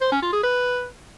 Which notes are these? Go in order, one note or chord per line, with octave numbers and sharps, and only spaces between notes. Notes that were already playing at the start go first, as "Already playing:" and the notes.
C5
C#4
F4
G#4
B4